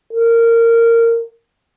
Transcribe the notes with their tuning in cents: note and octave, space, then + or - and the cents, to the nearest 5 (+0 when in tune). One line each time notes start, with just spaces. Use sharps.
A#4 -15